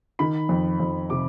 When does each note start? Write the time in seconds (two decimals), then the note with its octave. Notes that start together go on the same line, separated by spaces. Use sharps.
0.19 D#3 B5
0.49 F2
0.80 F2
1.10 C3 D6